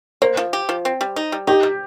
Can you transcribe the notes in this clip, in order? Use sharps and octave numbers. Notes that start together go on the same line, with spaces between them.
A#3 C5
F3
G4
F3
C4
G3
D#4
G3
D#4 G4
G3